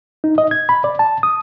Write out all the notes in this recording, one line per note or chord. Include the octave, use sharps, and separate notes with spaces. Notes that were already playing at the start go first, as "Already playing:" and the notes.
D#4
D#5
G#6
B5
D5
A5
D#6